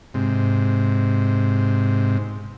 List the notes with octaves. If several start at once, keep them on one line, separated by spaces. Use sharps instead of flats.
G#2 C3